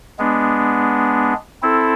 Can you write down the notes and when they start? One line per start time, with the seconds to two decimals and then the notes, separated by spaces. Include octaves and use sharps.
0.19 G#3 B3 D4
1.62 C4 E4 A4